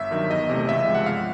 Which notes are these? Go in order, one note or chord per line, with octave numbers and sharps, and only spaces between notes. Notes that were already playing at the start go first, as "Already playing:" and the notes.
Already playing: G1 E5
G2 D#3 F#3
E2 D#5
C3 E3 A3
C#2 E5
C3 F3 G#3
F#5
G1 F5